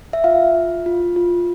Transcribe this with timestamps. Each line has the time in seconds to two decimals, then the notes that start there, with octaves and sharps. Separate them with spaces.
0.13 E5
0.24 F4 F5
0.55 F4
0.86 F4
1.16 F4